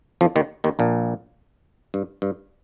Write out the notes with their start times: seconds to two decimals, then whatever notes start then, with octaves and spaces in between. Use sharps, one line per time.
0.21 F2 F3
0.36 D#2 D#3
0.64 D#2 D#3
0.79 A#1 A#2
1.94 G2
2.22 G2